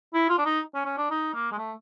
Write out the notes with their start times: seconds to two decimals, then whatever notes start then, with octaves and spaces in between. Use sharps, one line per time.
0.14 E4
0.29 F4
0.38 D4
0.45 D#4
0.74 C#4
0.85 C#4
0.98 D4
1.11 D#4
1.34 A#3
1.52 G#3
1.58 A3